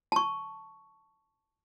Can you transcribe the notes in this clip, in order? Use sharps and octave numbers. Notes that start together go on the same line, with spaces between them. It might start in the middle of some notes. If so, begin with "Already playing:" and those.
A5 C#6